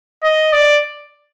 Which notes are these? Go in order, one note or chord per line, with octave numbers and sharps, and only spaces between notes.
D#5
D5